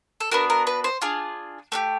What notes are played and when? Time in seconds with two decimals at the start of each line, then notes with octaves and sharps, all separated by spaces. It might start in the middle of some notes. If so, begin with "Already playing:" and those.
0.20 A4
0.31 B3 D4 F#4 A#4
0.50 A#4
0.67 B4
0.84 C5
1.02 D4 F4 G#4
1.72 A3 D4 G4